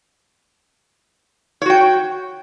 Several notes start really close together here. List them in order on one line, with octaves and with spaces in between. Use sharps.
C#5 F#4 G5